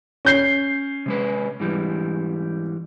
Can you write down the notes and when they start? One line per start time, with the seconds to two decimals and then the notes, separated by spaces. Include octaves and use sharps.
0.25 C#4 G6 C7
1.06 C3 G#3 B4
1.60 G#2 E3 G3